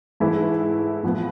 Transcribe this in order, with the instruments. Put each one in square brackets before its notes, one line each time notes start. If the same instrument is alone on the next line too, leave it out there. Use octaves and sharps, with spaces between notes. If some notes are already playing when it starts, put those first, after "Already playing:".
[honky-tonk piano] G#2 E3 A3 E4
A2 F3 B3